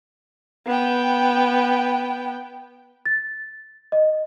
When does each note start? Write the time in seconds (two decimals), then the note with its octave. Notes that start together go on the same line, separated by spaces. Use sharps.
0.67 B3 G5
3.06 A6
3.92 D#5